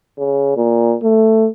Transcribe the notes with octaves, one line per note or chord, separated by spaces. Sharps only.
C#3
A#2
A3